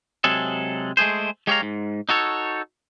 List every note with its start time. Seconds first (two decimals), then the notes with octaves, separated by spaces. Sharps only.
0.24 C3 F#3 G#3 G#4 A4
0.97 G#3 A3 G#4 C5
1.47 G#3 G4 C#5 D#5 F5 A#5
1.62 G#2
2.09 D#4 F#4 A4 C#5